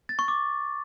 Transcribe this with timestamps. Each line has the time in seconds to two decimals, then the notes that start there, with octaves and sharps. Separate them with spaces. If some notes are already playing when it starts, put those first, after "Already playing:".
0.09 A6
0.19 C#6
0.28 D6